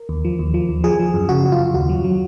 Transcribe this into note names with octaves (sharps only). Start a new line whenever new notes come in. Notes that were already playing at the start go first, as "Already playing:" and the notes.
Already playing: A#4
D#2
F3
D#2
F3
D#2
F3 G#4
F3
F#2
C#3 F#4
F#2
F4
F#2
D#2 F#4
F#3
F#3